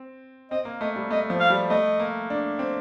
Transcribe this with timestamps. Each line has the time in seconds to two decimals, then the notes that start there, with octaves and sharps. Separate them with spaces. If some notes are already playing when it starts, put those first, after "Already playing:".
Already playing: C4
0.51 C4 D#5
0.65 A#3
0.80 A3 D#5
0.96 G3
1.11 A3 D#5
1.30 F3
1.40 F5
1.50 G3
1.70 A3 D#5
2.00 A#3
2.30 D4
2.59 C4